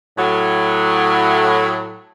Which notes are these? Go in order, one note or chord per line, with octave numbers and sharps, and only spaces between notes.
A2 F#3